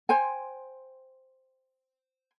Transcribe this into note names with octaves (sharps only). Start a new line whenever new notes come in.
C5 G5 G#5